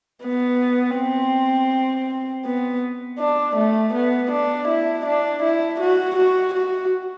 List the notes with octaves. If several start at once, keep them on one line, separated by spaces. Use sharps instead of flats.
B3
C4
B3
D4
A3
B3
D4
E4
D4
E4
F#4
F#4
F#4